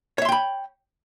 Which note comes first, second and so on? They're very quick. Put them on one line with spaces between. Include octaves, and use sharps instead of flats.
C#5 E5 C6 G5 B5